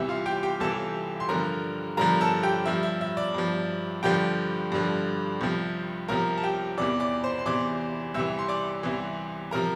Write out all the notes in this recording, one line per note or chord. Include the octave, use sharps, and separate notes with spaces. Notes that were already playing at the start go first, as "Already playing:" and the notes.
Already playing: C2 C3 E3 E5
F4 F5
G4 G5
G4 G5
C2 C3 E3 A4 A5
C6
G2 D3 F3 A#4 A#5
G2 D3 F3 A#4 A#5
A4 A5
G4 G5
G2 F3 E5
E5
E5
D5
G2 F3
G2 D3 F3 G4 G5
G2 D3 F3
C2 C3 F3
C2 C3 F3 A#4 A#5
A5
G4 G5
E2 C3 E3 D5 D6
D5 D6
C5 C6
C6
E2 C3 E3 D5 D6
C2 C3 E3 E5 E6
C6
D5 D6
C2 C3 E3
C3 F3 A#4 A#5